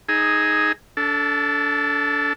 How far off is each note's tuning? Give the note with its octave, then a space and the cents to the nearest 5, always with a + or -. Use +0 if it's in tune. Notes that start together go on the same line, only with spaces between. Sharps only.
D#4 +0 G#4 +0 E6 -40
D4 -35 A4 +0